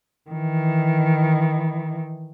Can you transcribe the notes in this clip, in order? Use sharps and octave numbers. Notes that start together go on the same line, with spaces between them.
D#3 E3